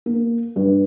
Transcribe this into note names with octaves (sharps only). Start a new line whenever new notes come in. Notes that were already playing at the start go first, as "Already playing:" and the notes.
A#3
G2